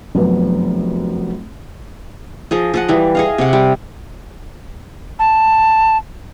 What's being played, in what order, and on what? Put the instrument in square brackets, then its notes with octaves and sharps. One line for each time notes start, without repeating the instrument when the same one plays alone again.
[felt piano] F1 F#2 B3
[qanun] F3 G#4 D#5
F3 D#5 F#5
E3 G3
G#4 D#5 F5
C3 F#5
G3
[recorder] A5